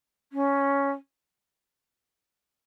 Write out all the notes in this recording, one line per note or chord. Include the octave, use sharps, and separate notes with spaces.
C#4